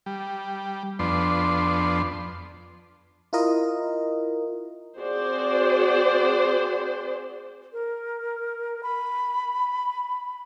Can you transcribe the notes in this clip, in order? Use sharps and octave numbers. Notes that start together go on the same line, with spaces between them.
G3
F2 B3 D4 C6
E4 F4 A#4 D#5
C4 F#4 G#4 C5 D5
A#4
B5